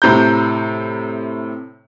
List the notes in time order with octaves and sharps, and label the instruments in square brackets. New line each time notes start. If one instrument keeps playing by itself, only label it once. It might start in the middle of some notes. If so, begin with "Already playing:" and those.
[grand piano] A2 C3 A#5 G6